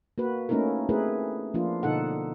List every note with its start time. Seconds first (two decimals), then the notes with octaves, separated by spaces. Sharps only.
0.18 A#3 F#4 B4
0.49 A3 A#3 C#4 D#4 E4 A#4
0.89 A3 C4 E4 G#4 A#4 B4
1.54 F3 A#3 D4 F4
1.83 B2 D3 D#4 A4 F#5